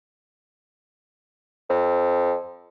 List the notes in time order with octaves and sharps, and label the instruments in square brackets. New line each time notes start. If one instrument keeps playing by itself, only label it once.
[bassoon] F2